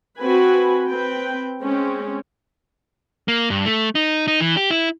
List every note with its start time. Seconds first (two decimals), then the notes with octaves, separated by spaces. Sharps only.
0.18 C4 F#4 B4 G#5 B5
0.89 C4 B4 G5
1.61 G#3 C4 C#4
3.28 A#3
3.50 G2
3.66 A3
3.95 D#4
4.28 D#4
4.40 E3
4.57 G4
4.70 E4